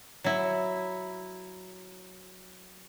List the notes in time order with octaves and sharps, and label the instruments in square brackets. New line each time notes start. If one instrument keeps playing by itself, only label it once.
[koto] F#3 E4